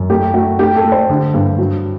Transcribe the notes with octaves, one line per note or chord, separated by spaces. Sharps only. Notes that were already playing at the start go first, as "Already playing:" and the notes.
Already playing: F#2
A3 G4
A3 F#4
A3 G4
A4
A3
C5
D3
G2
F#3